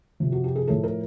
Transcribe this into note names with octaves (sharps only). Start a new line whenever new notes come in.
C3 F3
F#4
G4
G#4
A2 F3 A4
A#4